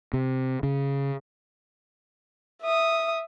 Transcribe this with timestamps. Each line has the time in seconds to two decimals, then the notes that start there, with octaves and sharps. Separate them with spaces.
0.13 C3
0.63 C#3
2.62 E5 D#6